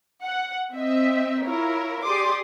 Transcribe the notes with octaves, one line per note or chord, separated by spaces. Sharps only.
F#5
C4 D#5 E5
E4 F4 A#4 C#5
G4 G#4 D5 C6 D6 D#6